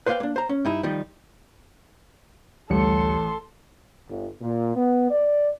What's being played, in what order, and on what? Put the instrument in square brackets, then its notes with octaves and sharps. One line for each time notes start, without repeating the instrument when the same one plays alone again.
[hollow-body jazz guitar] B4 C5 D5 E5 F5 G5
A#3 D4
C5 A#5
C#4
G2 D#4 E4
D#3 F3 G3 D#4
[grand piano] A1 [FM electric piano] D2 G3 C#7 [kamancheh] A4 C6
[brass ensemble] G1
A#2
B3
D5